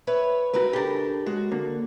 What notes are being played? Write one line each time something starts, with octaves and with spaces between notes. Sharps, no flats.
B4 C#5 E5
C2 A3 F#4 A#4 B4
C#3 D4 G4 A4 A#4
G#3 F#4
D3 A#3